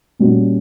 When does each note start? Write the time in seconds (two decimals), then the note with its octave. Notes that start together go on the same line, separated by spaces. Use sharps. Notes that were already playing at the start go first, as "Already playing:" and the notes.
0.19 A#2 G3 C#4 F#4